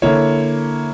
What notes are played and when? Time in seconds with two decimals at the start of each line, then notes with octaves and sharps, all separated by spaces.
0.02 D3 A#3 E4 C#5